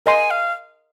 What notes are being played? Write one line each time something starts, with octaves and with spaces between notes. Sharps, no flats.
A#4 D#5 G#5 C6
F5